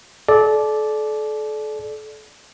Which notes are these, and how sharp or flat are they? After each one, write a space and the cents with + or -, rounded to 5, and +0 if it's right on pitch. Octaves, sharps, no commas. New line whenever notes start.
A4 -35 D5 +0